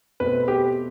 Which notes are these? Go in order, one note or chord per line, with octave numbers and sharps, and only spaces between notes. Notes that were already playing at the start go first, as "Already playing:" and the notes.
B2 A3 C4 B4
G4